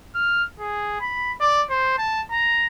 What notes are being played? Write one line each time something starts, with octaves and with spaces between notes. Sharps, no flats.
F6
G#4
B5
D5
C5
A5
A#5